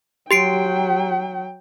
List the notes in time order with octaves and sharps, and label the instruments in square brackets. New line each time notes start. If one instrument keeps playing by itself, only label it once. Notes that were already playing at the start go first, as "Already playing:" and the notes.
[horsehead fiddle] F#3 G5 [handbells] G4 C7 D7